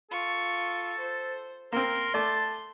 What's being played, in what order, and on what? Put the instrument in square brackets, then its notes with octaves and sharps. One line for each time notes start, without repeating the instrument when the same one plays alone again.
[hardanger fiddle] F4 C#6 [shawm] A4
[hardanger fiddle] C5
[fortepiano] A#3 C4 [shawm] A#4 [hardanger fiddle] C6
[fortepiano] A3 D5 [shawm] A5